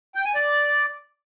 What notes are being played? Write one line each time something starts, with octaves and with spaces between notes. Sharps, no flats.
G5
G#5
D5